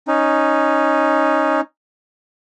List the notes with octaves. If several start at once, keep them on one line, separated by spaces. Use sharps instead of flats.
C#4 D#4